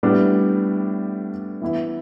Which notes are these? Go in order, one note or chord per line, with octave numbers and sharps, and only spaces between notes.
A2 G3 B3 D4
E3 B3 E4